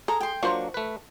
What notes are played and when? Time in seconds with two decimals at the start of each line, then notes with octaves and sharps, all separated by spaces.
0.08 G#4 A4 A#5
0.20 G5 C6
0.43 F#3 A#3 D4 F4 C5 F#5 C#6
0.74 A3 B4